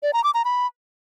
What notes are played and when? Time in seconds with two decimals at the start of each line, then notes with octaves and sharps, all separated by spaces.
0.03 D5
0.13 A#5
0.24 D6
0.34 A#5
0.45 B5